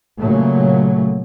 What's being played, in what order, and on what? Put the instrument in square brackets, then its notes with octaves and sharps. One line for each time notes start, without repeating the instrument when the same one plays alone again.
[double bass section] A#2 C#3 F#3 A3